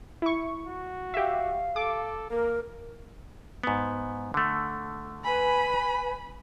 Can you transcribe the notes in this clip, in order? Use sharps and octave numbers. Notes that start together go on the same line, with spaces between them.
E4 C#6
F#4
G4 E5 F5
A4 D6
A#3 A#4
G#2 B3
D3 A3
B4 G#5 B5